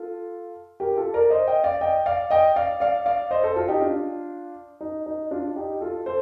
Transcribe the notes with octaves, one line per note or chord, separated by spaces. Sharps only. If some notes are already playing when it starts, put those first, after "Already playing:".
Already playing: F4 A4
G4 A#4
F4 A4
A#4 D5
C5 D#5
D#5 G5
D5 F5
D#5 G5
D5 F5
D#5 G5
D5 F5
D5 F5
D5 F5
C5 D#5
A4 C5
F4 A4
D#4 G4
D4 F4
D#4
D#4
D4 F4
D#4 G4
F4 A4
A4 C5